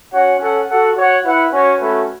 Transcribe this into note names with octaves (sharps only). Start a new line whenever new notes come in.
C#4 F#4 C#5 F#5
C#4 A4 F#5
F#4 A4 F#5
F#4 C#5 F#5
E4 B4 F#5
C#4 F#4 C#5
A3 C#4 F#4 B4